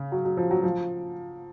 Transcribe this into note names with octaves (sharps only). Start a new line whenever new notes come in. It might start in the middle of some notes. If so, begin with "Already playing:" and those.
Already playing: C#3
F#3
F#3
F3
F#3
F3